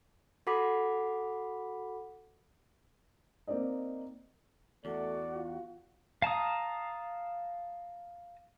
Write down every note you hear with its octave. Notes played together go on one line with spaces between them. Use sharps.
F#4 A4 F#5 B5 D6 B6
A#3 C4 D#4 D5 D#5
E2 A3 F#4 D5
F4
F5 A5 A#5 D#6